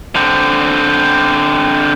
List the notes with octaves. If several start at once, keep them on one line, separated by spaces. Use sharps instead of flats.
D3 C4